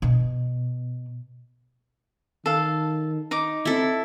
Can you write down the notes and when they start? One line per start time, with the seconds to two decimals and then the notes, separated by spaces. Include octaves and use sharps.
0.02 B2
2.46 D#3 A4 F5
3.31 D#4 D6
3.65 C4 E4 A4